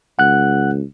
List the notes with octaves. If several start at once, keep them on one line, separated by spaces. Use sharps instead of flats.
C#2 F#5 F#6